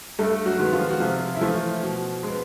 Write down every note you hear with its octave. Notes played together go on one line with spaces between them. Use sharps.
G2 A3 A4
F#3 F#4
D#3 G#3 B3
F3 F4
F#4
C3 F3 F4
E4
E3 F3 A3 F4
B2
G#3
B3